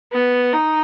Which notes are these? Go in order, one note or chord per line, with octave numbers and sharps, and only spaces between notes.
B3
D#4